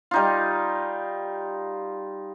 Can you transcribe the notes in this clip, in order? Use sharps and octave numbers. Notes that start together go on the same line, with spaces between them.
G3 D#4 F4